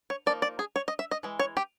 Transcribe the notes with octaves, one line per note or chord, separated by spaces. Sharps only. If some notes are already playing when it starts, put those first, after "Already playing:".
C#5
F3 A#3 D#4 D5
D5
G#4
C#5
D#5
E5
D#5
E3 G#3
C#5
G4